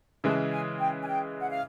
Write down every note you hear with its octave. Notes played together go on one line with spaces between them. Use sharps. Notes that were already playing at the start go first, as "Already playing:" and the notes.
C#3 E3 G#3 A5
G#5
G5
G#5
G5
F#5
F5